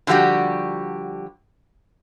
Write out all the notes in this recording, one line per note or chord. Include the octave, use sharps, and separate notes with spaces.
D3 F3 G3 F#4 G4